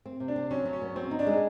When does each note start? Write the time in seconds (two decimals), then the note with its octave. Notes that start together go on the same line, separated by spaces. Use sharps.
0.06 C4
0.20 C3
0.28 D4
0.36 C4
0.51 F#3 C#4
0.65 F#3
0.73 C#4
0.82 B3
0.96 C4 F#4
1.11 D#4
1.19 D4
1.27 G#3